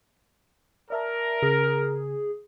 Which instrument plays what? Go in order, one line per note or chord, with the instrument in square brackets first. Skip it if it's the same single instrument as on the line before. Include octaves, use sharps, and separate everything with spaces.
[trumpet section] A#4 [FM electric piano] D5 E5 A5
[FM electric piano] C#3 [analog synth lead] G#4